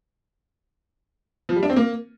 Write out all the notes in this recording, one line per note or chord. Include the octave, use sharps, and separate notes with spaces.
F3
G3
D4
C4
A#3